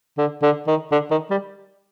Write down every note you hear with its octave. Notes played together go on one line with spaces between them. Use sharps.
D3
D3
D#3
D3
D#3
G3